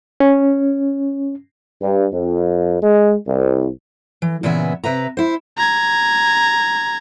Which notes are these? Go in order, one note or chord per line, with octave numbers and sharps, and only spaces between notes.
C#4
G2
F2
G#3
C2
E3
A#2 C#3 E3 B3 E5 G#5
C3 B4 E5 A#5
E4 C5
A#5 G#6